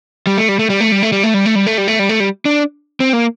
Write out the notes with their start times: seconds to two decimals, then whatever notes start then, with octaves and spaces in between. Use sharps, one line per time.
0.27 G3
0.38 A3
0.49 G3
0.59 A3
0.70 G3
0.81 A3
0.92 G3
1.03 A3
1.12 G3
1.23 A3
1.34 G3
1.46 A3
1.55 G3
1.67 A3
1.78 G3
1.88 A3
1.99 G3
2.09 A3
2.20 G3
2.45 D4
3.00 C4
3.13 A#3